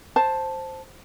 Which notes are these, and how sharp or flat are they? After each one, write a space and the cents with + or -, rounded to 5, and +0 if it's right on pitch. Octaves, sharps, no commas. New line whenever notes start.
C5 +5 A5 +0